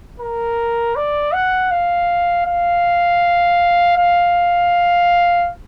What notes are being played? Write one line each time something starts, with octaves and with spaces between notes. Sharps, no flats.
A#4
D5
F#5
F5
F5
F5